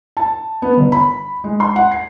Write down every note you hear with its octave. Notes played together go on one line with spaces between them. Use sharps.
A5
B3
G1
B5
G#3
C6
F#5
C7